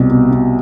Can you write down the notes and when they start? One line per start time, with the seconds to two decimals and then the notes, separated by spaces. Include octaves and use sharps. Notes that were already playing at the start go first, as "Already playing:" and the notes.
Already playing: C2 B2 G3
0.10 B2
0.31 B2